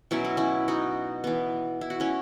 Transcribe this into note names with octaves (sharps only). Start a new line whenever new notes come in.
B2 F#3 C#4 E4
F#4
C#4 E4
D#4 F#4
E3 B3
E4
F#4
C#4 E4